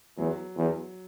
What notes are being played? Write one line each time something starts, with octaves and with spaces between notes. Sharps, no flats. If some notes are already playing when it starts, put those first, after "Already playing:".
E2 F#3
E2